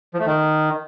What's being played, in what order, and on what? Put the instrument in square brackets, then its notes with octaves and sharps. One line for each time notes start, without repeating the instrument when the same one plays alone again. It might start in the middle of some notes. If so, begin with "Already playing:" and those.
[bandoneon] F3
A3
D#3